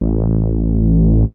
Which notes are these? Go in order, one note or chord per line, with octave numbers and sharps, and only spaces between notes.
A1